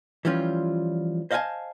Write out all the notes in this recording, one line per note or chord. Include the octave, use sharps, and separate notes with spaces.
E3 F3 G3 C#4 F4
C5 D#5 F5 F#5 G#5 A5